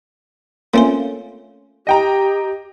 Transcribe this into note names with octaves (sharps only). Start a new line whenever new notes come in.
A3 A#3 C4 C#4 F4 C5
G4 D#5 G5 A#5